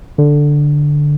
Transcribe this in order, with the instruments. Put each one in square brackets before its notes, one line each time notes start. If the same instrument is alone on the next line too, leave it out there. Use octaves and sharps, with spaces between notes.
[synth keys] D3